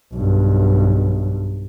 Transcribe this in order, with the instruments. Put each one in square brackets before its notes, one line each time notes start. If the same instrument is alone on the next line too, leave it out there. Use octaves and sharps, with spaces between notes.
[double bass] B1 G2